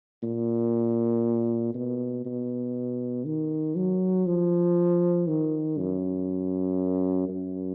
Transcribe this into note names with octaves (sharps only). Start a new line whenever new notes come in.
A#2
B2
B2
D#3
F#3
F3
D#3
F#2
F#2